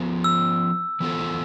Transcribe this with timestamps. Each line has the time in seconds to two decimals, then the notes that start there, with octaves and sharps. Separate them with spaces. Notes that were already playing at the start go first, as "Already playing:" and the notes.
Already playing: F3 B3 F4 C5
0.24 E6
1.00 E3 B3 F4 A4 C5